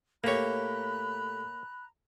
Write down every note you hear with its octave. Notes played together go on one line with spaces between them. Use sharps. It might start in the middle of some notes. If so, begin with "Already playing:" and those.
A2 A#3 G4 C#5 A#5 B5 F#6